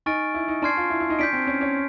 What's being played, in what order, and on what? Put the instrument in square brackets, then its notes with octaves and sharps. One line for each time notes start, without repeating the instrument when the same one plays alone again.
[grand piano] D#4 [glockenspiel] G#5 C#6 F6 A6 D7
[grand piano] E4
D#4
[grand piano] D4 [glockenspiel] A5 C6 F6 G#6 C7
[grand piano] F4
E4
E4
D#4
[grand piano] D4 [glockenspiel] G6 B6 D7
[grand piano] C4
C#4
C#4